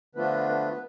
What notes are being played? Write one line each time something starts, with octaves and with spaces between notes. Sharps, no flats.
D3 F3 A3 B3 D4 F4 B4
B3 B4